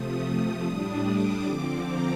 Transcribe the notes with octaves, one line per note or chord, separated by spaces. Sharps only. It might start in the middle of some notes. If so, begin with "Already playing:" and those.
Already playing: C3 F3 A3 D#6
A2 G3 D4
D6
D3 F3 C4
A#5